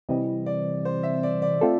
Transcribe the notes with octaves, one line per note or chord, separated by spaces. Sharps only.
C3 E3 G3 C4 D#5
D5
C5
E5
D5
D5
A3 C4 F4 A4